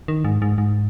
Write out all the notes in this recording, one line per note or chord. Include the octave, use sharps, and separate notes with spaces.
D#3
G#2
G#2
G#2